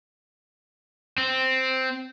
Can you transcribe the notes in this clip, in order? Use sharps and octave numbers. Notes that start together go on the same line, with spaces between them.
C4